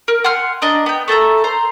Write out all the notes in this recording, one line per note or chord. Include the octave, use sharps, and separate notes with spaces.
A#4
F#5 G#5 C6 F6
D4 D#5 A#5
B3 G5
A3 A4 E5 A#5
C5 A#5 C6